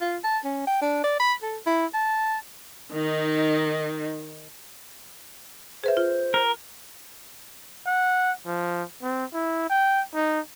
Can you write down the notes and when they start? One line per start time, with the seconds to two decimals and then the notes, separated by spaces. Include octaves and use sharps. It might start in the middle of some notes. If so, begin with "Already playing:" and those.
0.01 F4
0.24 A5
0.44 C#4
0.67 G5
0.82 D4
1.04 D5
1.20 B5
1.42 A4
1.66 E4
1.94 A5
2.92 D#3 D#4
5.84 G#4 B4 C5 E5
5.97 F4
6.34 A#4
7.86 F#5
8.46 F3
9.03 C4
9.33 E4
9.70 G5
10.14 D#4